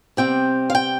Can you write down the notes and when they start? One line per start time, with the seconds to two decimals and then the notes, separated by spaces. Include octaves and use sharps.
0.17 C3 G3 C4 G5
0.70 F5
0.75 G5